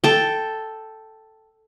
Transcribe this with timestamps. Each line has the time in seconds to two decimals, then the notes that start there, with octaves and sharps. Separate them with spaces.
0.04 A4 G5